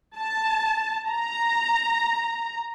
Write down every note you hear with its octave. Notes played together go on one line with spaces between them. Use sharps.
A5
A#5